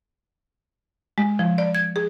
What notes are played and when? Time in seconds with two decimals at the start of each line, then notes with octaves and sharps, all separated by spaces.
1.18 G#3
1.39 F3
1.58 D5
1.75 G#6
1.96 G#4